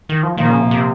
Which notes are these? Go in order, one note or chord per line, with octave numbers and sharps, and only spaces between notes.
D#3
F3
A#2 D#3 F3 A#3
C#3
C3
C3